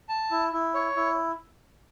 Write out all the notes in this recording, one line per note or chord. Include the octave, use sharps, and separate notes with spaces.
A5
E4
E4
C#5
E4